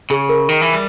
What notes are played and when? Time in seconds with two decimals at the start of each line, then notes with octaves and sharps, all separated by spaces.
0.10 C#3 G#4
0.29 A#4
0.49 D#3
0.61 E3
0.74 G3